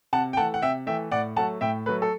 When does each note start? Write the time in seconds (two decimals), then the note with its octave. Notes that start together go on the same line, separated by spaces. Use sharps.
0.13 C3 F#5 A5
0.33 G5
0.37 A3 F#5 A5
0.41 E3
0.54 F#5
0.62 C3 E5 G5
0.86 E3 A3 E5 G5
1.12 A2 D5 F#5
1.36 F#3 A3 F#5 A5
1.61 A2 E5 G5
1.86 A3 B4
1.89 F#3
2.02 A4